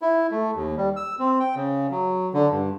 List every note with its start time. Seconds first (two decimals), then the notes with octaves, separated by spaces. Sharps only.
0.02 E4
0.31 A3
0.55 D#2
0.77 G3
0.96 E6
1.19 C4
1.40 G5
1.56 C#3
1.91 F#3
2.34 D3
2.51 G2